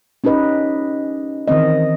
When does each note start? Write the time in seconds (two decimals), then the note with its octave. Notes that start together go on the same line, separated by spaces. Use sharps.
0.24 C#4 D#4 G4 B4 D#5
1.47 D#3 E3 C4 D#5